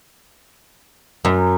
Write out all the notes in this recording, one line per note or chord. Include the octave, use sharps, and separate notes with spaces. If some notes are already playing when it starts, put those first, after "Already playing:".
F#2